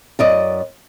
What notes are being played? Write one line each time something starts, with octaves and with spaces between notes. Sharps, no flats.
F#2 D5 D#5